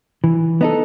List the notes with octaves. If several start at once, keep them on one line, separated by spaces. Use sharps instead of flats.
E3
B3 D#4 A4